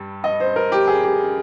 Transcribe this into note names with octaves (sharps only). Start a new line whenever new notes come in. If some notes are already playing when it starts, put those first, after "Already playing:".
Already playing: G2 G3
D#5
C5
A#4
G4
G#4
G4